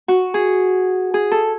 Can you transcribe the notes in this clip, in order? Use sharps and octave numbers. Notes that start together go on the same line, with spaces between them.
F#4
G#4
G#4
A4